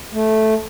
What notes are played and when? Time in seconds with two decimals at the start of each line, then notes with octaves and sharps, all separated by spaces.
0.13 A3